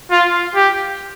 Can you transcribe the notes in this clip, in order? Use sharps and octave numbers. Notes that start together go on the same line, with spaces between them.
F4
G4